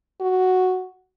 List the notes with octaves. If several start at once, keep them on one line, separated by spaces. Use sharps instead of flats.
F#4